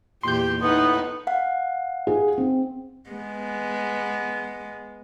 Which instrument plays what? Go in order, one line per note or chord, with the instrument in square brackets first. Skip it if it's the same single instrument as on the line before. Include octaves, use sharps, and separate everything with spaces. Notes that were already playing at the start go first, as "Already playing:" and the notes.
[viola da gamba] E2 A#2 G4 [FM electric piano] C6 G6
[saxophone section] A2 B3 [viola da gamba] D#4
[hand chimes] F5 F#5
[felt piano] G#4
C4
[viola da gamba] G#3 B3